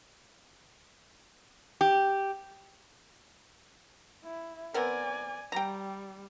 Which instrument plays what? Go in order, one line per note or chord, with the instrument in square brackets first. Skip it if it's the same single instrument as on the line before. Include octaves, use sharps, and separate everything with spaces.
[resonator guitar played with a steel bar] G4
[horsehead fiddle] E4
[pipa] B3 C4 A#4 [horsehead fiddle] D5 G#5
[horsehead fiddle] G3 [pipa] G5 A#5